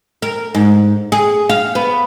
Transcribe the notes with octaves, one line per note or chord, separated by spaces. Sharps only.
A#4
G#2
G#4
F5
B3